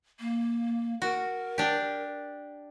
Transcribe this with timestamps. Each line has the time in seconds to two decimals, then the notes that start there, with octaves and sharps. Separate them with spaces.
0.20 A#3
1.02 F#4 A#4
1.58 D4 G4